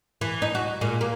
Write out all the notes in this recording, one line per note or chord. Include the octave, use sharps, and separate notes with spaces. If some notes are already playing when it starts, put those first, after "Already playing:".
E3
D#4
F#4
A#2 G#3
A#3